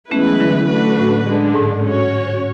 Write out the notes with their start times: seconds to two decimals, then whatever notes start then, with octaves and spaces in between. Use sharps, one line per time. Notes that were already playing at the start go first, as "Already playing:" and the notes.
0.11 E3 G#3 A3 B3 C#4 E4 B4
0.26 F#3 A3
0.40 D3 F#3
0.69 A3 D4 F#4 B4
0.98 A2
1.26 D3 G#3 D4
1.56 G#2
1.84 C#4 F#4 C#5